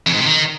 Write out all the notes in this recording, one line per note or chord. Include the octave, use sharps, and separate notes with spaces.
F2
G#2
C3
D#3